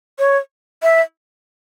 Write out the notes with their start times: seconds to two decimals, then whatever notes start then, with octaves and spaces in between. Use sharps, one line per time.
0.19 C#5
0.83 E5